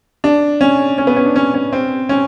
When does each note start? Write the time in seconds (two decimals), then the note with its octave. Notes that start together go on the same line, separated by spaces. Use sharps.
0.24 D4
0.61 C#4
0.98 C#4
1.07 B3
1.16 C#4
1.26 D4
1.36 C#4
1.54 C#4
1.73 C4
2.09 C#4